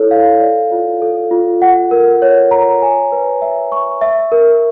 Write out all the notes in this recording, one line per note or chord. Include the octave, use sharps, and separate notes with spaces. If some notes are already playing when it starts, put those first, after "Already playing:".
Already playing: E4 A4 C#5
F5
D5
F4
A4
F4
F#5
A#4
C#5
A#5
G#5
B4
E5
C#6
E5
A#4